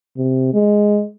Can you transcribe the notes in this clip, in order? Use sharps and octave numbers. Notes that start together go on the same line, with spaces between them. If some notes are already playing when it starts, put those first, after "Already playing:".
C3
G#3